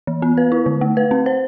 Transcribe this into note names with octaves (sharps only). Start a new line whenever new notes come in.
E3
B3
B4
E4
D3
A3
B4
C4
C5